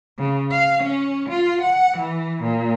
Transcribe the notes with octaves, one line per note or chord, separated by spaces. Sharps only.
C#3
F5
C#4
F4
F#5
E3
A#2